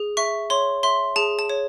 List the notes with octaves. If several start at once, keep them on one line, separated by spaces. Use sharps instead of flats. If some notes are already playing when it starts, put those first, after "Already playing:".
Already playing: G#4
E5 C#6
C#5 C6
E5 C6
G#4 A5
A5
C#5